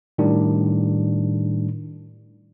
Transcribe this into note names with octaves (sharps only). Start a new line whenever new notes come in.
A2 D#3 G3 D4